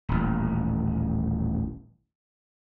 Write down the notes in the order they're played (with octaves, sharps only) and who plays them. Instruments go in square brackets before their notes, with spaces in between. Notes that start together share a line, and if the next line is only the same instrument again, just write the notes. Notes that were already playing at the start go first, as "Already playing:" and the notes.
[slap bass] D#1 A1